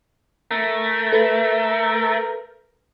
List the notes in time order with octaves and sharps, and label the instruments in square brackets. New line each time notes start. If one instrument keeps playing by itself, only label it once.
[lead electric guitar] A3 [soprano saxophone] A#4
[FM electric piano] A4 B4